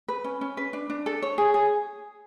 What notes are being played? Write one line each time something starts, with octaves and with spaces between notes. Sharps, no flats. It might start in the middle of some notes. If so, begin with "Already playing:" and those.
B4
C#4
C#4
B4
D4
D4
A4
C#5
G#4
G#4